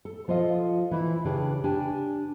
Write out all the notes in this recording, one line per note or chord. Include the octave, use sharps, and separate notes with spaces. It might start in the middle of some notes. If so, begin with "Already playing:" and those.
A4
F3 F4 A4 D#5 F5
E3 E4
C#3 D4 G4 B4
D4 G4 G#5